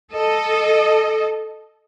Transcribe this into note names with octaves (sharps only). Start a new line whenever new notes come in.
A4 D#5